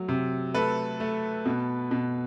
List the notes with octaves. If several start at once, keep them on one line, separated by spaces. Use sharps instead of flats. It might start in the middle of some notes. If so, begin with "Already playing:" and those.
Already playing: F#3 A3
C3
A3 A4 B4
A3
B2
B2